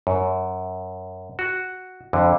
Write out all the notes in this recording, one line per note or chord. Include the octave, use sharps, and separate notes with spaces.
F#2
F#4
F2 D3